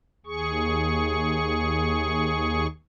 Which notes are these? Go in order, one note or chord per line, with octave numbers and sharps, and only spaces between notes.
D#2 G#4 C#6